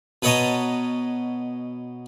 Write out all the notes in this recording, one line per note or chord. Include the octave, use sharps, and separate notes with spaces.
B2 B4 C#5 D#5 A5 A#5